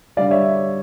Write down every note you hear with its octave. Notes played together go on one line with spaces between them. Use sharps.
D3 G3 D5 F5
C#5 E5